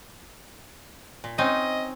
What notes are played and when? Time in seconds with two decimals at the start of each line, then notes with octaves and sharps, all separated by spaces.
1.24 A#2
1.38 C4 C#4 D#4 D#5